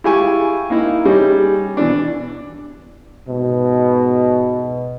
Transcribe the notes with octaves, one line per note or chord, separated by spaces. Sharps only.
E4 F4 G4 G#4 G#5 C#6
A#3 D#4 E4
G3 C#4 D#4 G#4
B2 E3 D4
G#2 B2